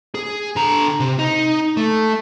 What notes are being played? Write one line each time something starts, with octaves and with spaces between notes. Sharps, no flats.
G#4
D3 A#5
C3
D#4
A3